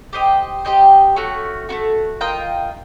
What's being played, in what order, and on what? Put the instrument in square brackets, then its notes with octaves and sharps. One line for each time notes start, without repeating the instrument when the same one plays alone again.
[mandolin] G4 C5 D#5 G5
G4 C5 D#5 G5
A3 C#4 F#4
A3 C#4 F#4
F4 A#4 D#5 G5